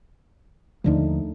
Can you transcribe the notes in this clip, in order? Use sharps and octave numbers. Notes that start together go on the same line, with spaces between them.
D#2 D3 F3 A3 D4 D#4